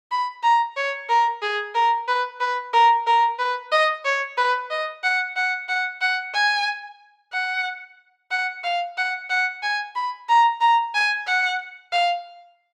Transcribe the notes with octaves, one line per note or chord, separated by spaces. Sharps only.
B5
A#5
C#5
A#4
G#4
A#4
B4
B4
A#4
A#4
B4
D#5
C#5
B4
D#5
F#5
F#5
F#5
F#5
G#5
F#5
F#5
F5
F#5
F#5
G#5
B5
A#5
A#5
G#5
F#5
F5